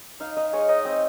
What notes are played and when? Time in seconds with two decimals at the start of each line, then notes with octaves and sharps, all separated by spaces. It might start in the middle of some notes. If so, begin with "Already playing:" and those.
0.20 D#4 F5
0.37 D#4 D#5
0.53 G#3 C#5
0.69 D#4 D#5
0.85 C4 D#5